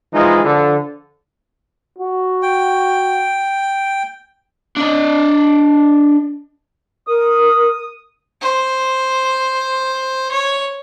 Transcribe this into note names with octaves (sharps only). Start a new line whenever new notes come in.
E3 F3 G#3 D#4 F4
D3 F3 A4
F#4
G5
D4 D#5
A#4 D#6
C5
C#5